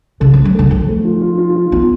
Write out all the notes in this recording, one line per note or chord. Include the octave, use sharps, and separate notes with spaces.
C#3 A4
F3 A3
F#3
D3 A4
F3 A4
A3
F4
F4
F4
F4
B3 F4